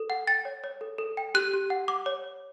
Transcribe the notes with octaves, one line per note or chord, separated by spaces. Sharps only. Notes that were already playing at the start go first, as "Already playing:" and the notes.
Already playing: A4
F#5
G5 A6
C#5
C#5
A4
A4
G5
G4 F#6
G4
F#5
F#5 D6
C#5
C#5